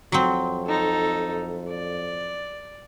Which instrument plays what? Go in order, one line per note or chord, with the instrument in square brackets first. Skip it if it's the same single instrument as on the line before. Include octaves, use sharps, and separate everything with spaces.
[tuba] F2 [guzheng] F#3 C4
[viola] D#4 A4
D5